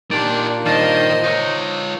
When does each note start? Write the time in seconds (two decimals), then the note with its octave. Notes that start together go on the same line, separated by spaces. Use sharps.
0.11 A#2 D4 D#4 G4 D5
0.66 G2 D#3 C5 D#5 F5 A5
1.24 D#4 F4 C#5